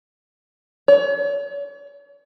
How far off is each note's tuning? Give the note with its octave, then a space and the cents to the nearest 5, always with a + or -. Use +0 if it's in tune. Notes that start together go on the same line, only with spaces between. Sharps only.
C#5 +40